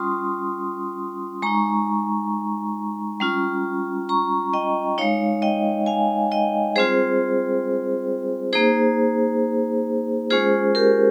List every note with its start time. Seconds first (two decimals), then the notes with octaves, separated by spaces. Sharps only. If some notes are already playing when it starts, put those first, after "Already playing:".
Already playing: G3 C#4 F4 C6 D#6
1.42 G#3 D#4 A#5 C#6
3.20 G3 C#4 F4
4.09 A#5 C#6
4.53 D#5 G5
4.98 G#3 D#4 C#5 F5
5.42 D#5 G5
5.86 F5 G#5
6.32 D#5 G5
6.76 G3 C4 F4 G#4 C5
8.53 A#3 D#4 G#4 C5
10.30 G#3 C#4 F4 G#4 C5
10.75 G4 A#4